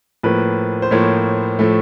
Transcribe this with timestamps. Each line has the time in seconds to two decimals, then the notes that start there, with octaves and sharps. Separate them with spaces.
0.23 A2 F3 A#3 B4
0.82 C5
0.91 A2 F3 A#3 C#5
1.59 A2 F3 A3